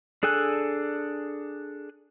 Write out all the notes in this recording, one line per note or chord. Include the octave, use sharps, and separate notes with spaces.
D4 G#4 A4 G#5 F#6